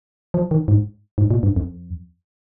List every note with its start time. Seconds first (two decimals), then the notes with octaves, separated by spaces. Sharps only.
0.34 F3
0.51 D#3
0.68 G#2
1.18 G#2
1.31 A#2
1.43 G2
1.56 F2